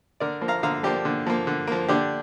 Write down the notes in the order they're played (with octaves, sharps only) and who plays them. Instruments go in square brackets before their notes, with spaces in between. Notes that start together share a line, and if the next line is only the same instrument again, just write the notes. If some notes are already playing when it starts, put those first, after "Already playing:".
[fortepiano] D3 A#4 D5
F3 A#3
F5 A#5
D3 F5 A#5
F3 A#3 D4 G4
D3
F3 A#3
D3
F3 A#3
D3 D4 G4